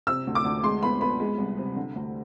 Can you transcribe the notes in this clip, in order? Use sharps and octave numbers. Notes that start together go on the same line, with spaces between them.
C3 E6
D2
D6
D2
G#3 C6
B3 B5
B3 B5
G#3
C2
C3
D3
D2